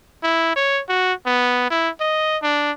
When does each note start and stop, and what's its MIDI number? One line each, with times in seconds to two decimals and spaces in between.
0.23 0.56 64
0.56 0.82 73
0.89 1.14 66
1.26 1.66 59
1.71 1.90 64
2.00 2.38 75
2.43 2.72 62